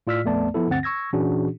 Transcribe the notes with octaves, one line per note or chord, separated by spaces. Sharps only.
A2 F4 D5 E6 F6 B6
A#1 F2 A3 B3 D5 A5
F3 B3 E4 A4
D2 G2 D3 C4 F#5 A6
C#6 E6 G#6 A#6
A#2 E3 C#4 D4 F#4 G#4